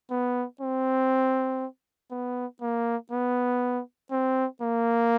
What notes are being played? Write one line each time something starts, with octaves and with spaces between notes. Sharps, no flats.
B3
C4
B3
A#3
B3
C4
A#3